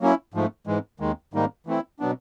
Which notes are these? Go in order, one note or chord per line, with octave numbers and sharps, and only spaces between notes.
F#3 A#3 C#4 E4
G#2 F3 A3
G#2 E3 G#3
D#2 D#3 G#3
G#2 D#3 G3 A#3 D#4
E3 A3 C4 E4
B2 F#3 B3 D4